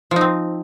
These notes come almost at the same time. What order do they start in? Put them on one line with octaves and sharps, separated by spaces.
F3 D#4 C4